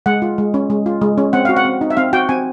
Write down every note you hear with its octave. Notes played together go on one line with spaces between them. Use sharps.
G#3 F#5
F4
G#3
C#4
G#3
F4
G#3
C#4
C4 F#5
F#4 F5
F#5
C4
D#4
E5
C4 F5
F#4 G5
C4 G#5